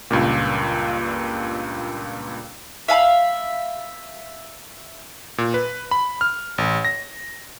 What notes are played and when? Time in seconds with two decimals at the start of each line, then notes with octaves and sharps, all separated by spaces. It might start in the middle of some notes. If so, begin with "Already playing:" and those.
0.11 C#2 G2 A#2
2.88 E5 F5 G#5 B5
5.38 A#2
5.54 B4
5.91 B5
6.21 F6
6.58 A1
6.85 A#6